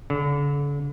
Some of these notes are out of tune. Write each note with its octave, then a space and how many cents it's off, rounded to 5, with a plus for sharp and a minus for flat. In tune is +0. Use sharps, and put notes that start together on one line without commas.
D3 -40